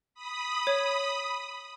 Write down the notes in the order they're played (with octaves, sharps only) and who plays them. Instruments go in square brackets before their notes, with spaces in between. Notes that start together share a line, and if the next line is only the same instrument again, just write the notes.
[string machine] B5 D#6
[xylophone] C#5